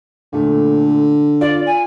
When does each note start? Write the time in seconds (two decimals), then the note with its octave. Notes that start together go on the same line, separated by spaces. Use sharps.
0.33 A#2 D3 A3
1.41 F4 D5
1.66 G#5